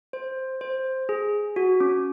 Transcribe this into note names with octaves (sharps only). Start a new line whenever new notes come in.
C5
C5
G#4
F#4
C#4